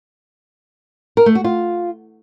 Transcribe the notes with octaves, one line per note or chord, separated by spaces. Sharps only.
A#4
A3
F#4
F4